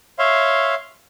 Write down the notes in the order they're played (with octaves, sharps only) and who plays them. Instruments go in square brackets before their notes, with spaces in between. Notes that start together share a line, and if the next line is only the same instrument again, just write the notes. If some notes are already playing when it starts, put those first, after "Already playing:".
[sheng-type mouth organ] C#5 E5 F5 C6